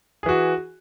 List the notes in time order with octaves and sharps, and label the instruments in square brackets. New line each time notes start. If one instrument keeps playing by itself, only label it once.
[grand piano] G#4
E3
F#4